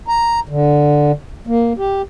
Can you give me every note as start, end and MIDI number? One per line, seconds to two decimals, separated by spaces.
0.08 0.40 82
0.49 1.12 50
1.47 1.73 58
1.78 2.02 67